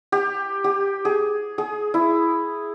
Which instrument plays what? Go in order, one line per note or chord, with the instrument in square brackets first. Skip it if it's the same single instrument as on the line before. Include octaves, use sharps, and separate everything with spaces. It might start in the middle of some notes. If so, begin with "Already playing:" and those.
[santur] G4
G4
G#4
G#4
E4